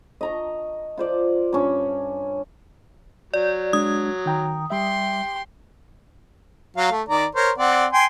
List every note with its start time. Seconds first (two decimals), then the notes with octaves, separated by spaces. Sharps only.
0.21 D#5 A#5 C#6
0.98 F4 C5 D5
1.53 G2 C#4
3.34 F#3 D5
3.73 G#3 D4 D#6 G#6
4.26 D#3 G5 A#5
4.70 G3 G4 E5 C6
6.77 F#3 F5
6.91 A3
7.09 D#3 D5 A#5
7.35 A#4 C5 C#5
7.58 C4 D5 F#5
7.93 G5 G#5 C6